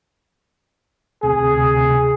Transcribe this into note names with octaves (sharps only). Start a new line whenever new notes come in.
D2 C3 G#4